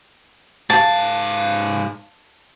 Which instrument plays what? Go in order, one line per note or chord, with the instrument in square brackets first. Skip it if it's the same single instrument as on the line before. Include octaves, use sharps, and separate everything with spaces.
[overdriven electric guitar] G#2 F5 [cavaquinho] A5